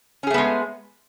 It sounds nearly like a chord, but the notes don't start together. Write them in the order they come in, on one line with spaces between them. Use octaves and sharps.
C#4 G#4 A3 B3 G#3